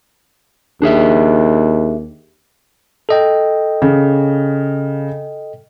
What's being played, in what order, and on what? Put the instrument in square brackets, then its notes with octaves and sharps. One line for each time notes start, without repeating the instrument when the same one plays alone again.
[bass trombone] D#2 [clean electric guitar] D4 G#4 E5
[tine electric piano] A4 D#5 G5
[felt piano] C#3